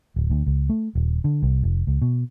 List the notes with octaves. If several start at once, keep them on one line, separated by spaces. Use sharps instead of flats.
D1
D2
C#2
A3
D#1
D3
C2
F1
C#2
B2